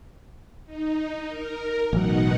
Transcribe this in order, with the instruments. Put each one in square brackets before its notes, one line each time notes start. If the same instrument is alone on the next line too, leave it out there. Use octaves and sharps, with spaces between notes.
[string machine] D#4
A#4
[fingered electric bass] A1 F#3 [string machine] B2 D#4 F#5